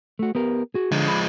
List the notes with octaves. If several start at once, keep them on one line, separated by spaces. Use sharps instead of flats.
A3 F#4
B3 G4 A#4
F#4 G#4
D3 F3 G#3
B5